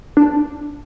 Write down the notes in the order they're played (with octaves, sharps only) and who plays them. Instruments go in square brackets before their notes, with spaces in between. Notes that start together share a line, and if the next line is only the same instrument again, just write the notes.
[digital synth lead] D4